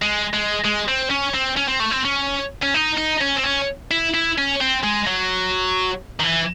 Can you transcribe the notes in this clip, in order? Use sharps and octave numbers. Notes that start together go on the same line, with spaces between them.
G#3
G#3
G#3
C4
C#4
C4
C#4
C4
A3
C4
C#4
C#4
D#4
D#4
C#4
C4
C#4
E4
E4
C#4
C4
G#3
F#3
D#3
E3